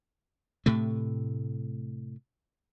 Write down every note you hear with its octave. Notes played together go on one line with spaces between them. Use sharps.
A2 C3 A3